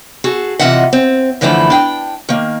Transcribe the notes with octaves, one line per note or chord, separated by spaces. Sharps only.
F#4 G#4 A4
C3 E3 F4 D#5 E5 F#5
C4
F#2 D3 E3 F3 A3 E4
D4 G5
D#3 A#3